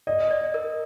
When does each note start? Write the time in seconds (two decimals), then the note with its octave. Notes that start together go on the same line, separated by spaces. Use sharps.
0.07 D5 D#5
0.31 D5
0.54 A#4